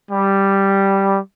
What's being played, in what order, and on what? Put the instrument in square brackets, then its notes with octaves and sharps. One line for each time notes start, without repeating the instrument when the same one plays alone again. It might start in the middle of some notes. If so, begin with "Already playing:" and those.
[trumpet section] G3